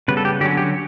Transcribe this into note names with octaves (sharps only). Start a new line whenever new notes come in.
C#3 G3 B3 B4
A4
G4
D3 F#3 C#4 G4
G4